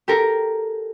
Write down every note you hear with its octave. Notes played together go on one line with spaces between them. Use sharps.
G4 A4 A#4